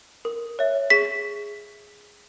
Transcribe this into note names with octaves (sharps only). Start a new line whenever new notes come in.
A#4
C#5 E5
G#4 B6